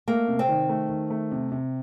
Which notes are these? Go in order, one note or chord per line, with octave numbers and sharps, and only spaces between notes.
A3 A#3
C3
C4
D#3
A3
D#3
A3
C3
C3